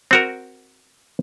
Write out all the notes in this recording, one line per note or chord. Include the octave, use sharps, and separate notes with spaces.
C4 F#4 A#4